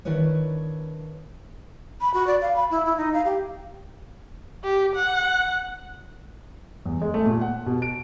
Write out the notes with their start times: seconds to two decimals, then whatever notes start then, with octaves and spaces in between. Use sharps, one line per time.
0.05 D#3 D4 E4 B4 C#5
2.01 B5
2.14 F#4
2.27 D5
2.41 F5
2.56 B5
2.71 E4
2.86 E4
2.97 D#4
3.13 F5
3.25 G4
4.64 G4
4.96 F#5
6.86 E2
7.02 G#3
7.14 A3
7.26 A#2
7.41 F#5
7.66 B2
7.82 D7